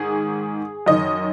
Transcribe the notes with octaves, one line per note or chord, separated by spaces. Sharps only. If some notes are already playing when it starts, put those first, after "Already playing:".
Already playing: G#2 D#3 G#4
F#2 D#3 D#5